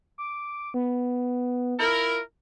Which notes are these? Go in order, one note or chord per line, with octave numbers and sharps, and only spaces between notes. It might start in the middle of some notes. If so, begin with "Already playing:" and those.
D6
B3
E4 F4 A#4